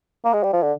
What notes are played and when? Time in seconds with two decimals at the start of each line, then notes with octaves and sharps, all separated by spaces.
0.25 A#3
0.33 G#3
0.43 G3
0.53 F3
0.63 D3